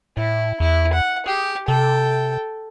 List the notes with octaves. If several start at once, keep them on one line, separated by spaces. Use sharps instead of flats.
A2 E4
E2 E4
F#5
G4 G#4
C3 A4 G5